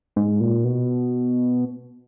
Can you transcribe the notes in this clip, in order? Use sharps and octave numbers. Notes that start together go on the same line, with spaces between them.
G#2
A#2
B2